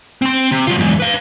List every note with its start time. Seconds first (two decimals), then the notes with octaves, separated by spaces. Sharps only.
0.22 C4 C6
0.52 C3
0.67 F#3 F4
0.78 E2 G#2
1.00 B4 F5